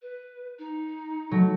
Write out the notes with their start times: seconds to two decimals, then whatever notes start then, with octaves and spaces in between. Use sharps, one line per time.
0.02 B4
0.59 D#4
1.31 F#3 A3